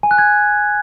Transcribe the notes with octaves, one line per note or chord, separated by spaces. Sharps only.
G#5
F#6
G#6